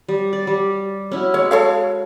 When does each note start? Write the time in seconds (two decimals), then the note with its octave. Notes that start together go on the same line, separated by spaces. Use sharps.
0.08 G3
0.33 D5
0.47 G3
1.11 C#4 E4 F#4
1.34 G#3 C#5
1.51 A4 C#5 F5